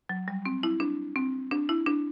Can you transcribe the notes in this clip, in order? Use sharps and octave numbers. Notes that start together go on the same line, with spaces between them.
F#3
G3
C4
E4
D4
C4
D4
E4
D4